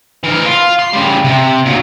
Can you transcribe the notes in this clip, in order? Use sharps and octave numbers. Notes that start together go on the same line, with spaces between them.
E3 A#4
F4
C6
C#3 G3
C3
A#2 F#3